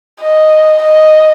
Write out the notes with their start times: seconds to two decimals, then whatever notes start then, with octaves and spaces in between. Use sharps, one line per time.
0.21 D#5
0.83 D#5